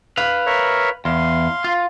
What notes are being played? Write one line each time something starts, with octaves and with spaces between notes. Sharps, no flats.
B4 F5
A#4 C#5 E5
E2 F5 C6
F4